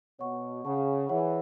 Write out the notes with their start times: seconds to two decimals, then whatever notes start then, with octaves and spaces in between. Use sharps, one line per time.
0.19 B2 C#5 F#5 C#6
0.64 C#3 C#5 F#5 A5 C#6
1.09 E3 E4 G#4 C#5 F#5